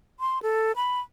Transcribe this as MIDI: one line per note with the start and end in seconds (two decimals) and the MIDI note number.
0.20 0.39 84
0.43 0.72 69
0.76 1.00 83